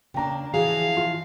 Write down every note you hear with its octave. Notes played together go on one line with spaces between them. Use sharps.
C#3 A#3 D4 G5 A#5
E3 F3 F#4 G#4 F5
F4